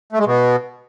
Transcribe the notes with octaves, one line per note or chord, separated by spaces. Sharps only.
A3
G#3
B2